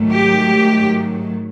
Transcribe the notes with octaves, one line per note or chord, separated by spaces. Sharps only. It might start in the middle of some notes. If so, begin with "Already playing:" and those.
Already playing: G#2 D#3 F#3 A3
G4